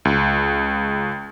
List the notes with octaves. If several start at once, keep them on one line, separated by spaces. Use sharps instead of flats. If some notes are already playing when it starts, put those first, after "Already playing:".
C#2